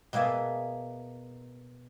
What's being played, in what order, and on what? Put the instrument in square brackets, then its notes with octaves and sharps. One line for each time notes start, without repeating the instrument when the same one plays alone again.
[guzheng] B2 A#3 G#4 E5 A5